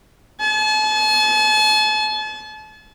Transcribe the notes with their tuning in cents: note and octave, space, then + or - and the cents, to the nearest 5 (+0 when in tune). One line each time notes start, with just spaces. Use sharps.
A5 -40